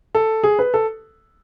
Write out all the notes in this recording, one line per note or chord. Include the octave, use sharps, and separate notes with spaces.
A4
G#4
B4
A4